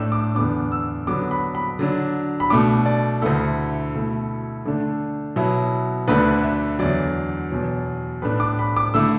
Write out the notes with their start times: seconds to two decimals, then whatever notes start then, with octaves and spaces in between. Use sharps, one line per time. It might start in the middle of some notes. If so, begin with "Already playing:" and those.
Already playing: A2 A3 D4 E6
0.12 D6
0.35 E2 D3 B3 D4 D6
0.72 E6
1.07 D3 F#3 B3 D4 D6
1.31 B5
1.55 B5
1.79 D3 F#3 D4
2.40 B5
2.50 B2 A3 D4 D6
2.86 D5
3.22 D2 D3 A3 E4 A4
3.94 B2 A3 E4
4.65 D3 A3 D4
5.36 B2 F#3 B3 E4
6.08 D2 D3 A3 D4 B4
6.44 E5
6.79 E2 D3 F#3 D5
7.51 E2 B2 F#3
8.22 A2 A3 D4 B4
8.40 D6
8.59 B5
8.76 D6
8.94 D3 A3 E4 E6